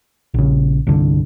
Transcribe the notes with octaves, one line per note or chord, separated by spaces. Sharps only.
A#1 C#3
C2 G2 D3